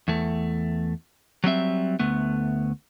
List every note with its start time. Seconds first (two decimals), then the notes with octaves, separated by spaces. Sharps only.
0.08 E2 A3
1.44 F#3 G3 C4 E5
1.99 D2 A3 B3